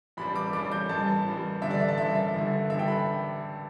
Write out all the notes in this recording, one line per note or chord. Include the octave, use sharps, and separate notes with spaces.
A1 G2 G3 B5
D6
A1 G2 G3 D6
G6
A1 G2 G3 A5
A1 G2 G3
A1 G2 D3 E5
D5
E5
A5
A1 G2 D3 E5
E5
A1 G2 D3
A1 G2 D3 E5
G5
B5